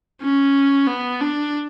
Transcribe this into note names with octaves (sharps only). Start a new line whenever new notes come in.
C#4
B3
D4